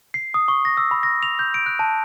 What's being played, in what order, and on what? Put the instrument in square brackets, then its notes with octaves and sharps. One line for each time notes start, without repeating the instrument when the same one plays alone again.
[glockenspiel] C7
D#6
C#6
A#6
E6
B5
A#6
F7
G6
D7
F#6
A5